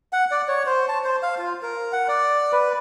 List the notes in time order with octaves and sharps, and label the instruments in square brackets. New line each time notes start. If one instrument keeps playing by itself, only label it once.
[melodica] F#5
D5
C#5
C5
A5
C5
F5
F4
A#4
F#5
D5
B4